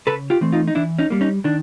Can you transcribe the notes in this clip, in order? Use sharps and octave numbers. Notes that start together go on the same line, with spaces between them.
C#3 A4 B4
F4 G4
E3 A3 C4
D#4 F4
D#4
E3 D4 E4
C#4 D#4
G3 A#3
C#4 D#4
D#3 D4